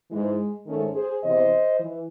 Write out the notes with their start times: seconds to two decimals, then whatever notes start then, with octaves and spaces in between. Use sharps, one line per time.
0.11 G#2 E3 G#3
0.67 G#2 D#3 A3 C#4
0.95 G#4 C5
1.23 E2 C3 E3 C5 D#5
1.80 E3